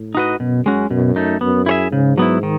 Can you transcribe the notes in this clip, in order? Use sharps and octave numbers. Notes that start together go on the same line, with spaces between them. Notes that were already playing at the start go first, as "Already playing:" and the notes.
Already playing: A2
D#4 F#4 B4 D#5
F#2 B2
G#3 C#4 F#4
F#2 B2
A3 D#4
F#2 B3
E4 G#4 C#5 E5
G#2 C#3
F#3 B3 E4
D#3